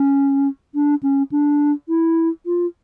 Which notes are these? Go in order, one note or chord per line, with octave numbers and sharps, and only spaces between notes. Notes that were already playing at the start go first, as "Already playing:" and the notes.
Already playing: C#4
D4
C#4
D4
E4
F4